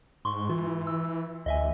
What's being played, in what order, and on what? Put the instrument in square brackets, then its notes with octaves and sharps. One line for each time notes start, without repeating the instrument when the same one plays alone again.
[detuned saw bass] G#2 [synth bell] C6 C#6
[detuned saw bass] E3 [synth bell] F4
[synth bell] E6
[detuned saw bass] D2 [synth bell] D#5 E5 G#5